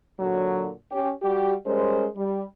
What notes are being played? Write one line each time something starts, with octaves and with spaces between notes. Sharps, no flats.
A#2 D3 F#3
C#4 G4
G3 F#4 G4
G3 G#3 C#4 A#4 C5
G3